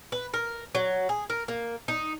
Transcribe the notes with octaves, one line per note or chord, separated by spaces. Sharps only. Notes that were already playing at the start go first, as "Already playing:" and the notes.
B4
A#4
F#3
G#4
A#4
A#3
D#4